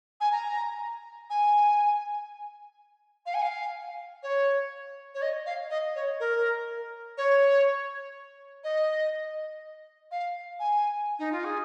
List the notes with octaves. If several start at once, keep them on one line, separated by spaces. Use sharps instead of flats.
G#5
A#5
G#5
F5
G#5
F5
C#5
C#5
D#5
F5
D#5
C#5
A#4
C#5
D#5
F5
G#5
D#4
F4
G#4